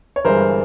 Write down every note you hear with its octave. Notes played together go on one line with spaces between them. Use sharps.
C#5
G1 G2 E3 G#3 A#4 C5